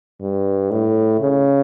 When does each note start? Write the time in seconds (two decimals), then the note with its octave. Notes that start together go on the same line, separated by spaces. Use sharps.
0.21 G2
0.71 A2
1.20 C#3